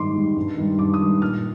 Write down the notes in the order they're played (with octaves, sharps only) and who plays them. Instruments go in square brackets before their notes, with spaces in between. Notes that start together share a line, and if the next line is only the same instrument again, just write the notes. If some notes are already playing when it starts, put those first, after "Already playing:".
Already playing: [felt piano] G#2 D#3 G3 C6 D6
D#3 G3
G2
D#3 G3
G2 D6
D#6
D#3 G3
A#2 F6